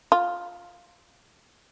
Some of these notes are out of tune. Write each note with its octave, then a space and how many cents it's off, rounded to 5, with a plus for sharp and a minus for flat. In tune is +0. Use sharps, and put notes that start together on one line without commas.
F4 +10